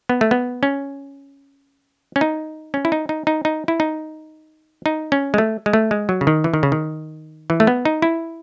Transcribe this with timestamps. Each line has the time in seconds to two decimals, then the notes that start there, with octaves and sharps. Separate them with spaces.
0.09 B3
0.21 A3
0.31 B3
0.63 C#4
2.16 C#4
2.21 D#4
2.74 C#4
2.85 E4
2.92 D#4
3.09 D#4
3.27 D#4
3.45 D#4
3.68 E4
3.80 D#4
4.86 D#4
5.12 C#4
5.34 G#3
5.38 A3
5.66 G#3
5.73 A3
5.91 G#3
6.09 F#3
6.21 C#3
6.27 D#3
6.44 E3
6.54 D#3
6.63 C#3
6.72 D#3
7.50 E3
7.60 A3
7.67 B3
7.85 D#4
8.02 E4